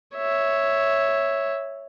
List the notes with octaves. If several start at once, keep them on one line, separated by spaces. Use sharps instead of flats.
C#5 E5